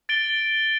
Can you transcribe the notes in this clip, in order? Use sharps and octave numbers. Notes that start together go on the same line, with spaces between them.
A6 D7 G7